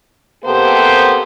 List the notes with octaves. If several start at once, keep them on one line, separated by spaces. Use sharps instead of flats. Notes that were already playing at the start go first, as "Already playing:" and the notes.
C3 A#3 B3 G4 A4 C5